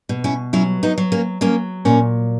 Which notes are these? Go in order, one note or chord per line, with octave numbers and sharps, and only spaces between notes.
B2
C#4 E4
F#3 C#4 E4
B3 D#4
F#3
A#3 C#4
F#3 A#3 C#4
A#2 A#3 C#4